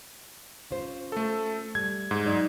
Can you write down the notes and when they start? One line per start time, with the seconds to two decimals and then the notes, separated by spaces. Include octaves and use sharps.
0.71 C#4 F4 C5
1.12 A3 A4
1.75 G3 G#6
2.11 G#2
2.26 F#3 D#4 D5